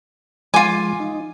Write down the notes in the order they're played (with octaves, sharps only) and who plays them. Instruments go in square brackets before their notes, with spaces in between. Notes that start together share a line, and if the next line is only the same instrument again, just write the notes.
[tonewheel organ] F3 G#3 [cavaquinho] F4 D6 [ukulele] G#5
[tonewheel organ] D#4